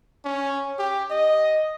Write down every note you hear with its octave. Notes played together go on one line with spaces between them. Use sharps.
C#4
G4
D#5